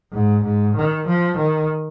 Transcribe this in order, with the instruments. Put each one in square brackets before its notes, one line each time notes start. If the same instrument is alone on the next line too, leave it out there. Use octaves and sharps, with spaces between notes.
[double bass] G#2
G#2
D#3
F3
D#3